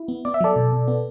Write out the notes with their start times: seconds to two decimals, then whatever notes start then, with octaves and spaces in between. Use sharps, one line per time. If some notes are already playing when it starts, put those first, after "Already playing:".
Already playing: E4
0.08 B3
0.25 B3 D5
0.34 E5
0.41 F#3 A4 D5
0.56 B2
0.73 B2
0.88 B3